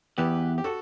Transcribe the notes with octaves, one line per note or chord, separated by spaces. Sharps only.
E2 G4 B4
G4
F#4 A4